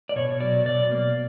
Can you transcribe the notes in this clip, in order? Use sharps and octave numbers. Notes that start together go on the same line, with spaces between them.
D5
B2 C#5
F#3 D5
B2 D5
A#3